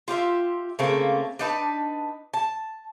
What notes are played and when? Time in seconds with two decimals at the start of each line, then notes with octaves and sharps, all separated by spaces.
0.08 F4 G4 C5 E5
0.79 C#3 A3 A#3 C4
1.39 D4 D#4 B4 A5
2.34 A5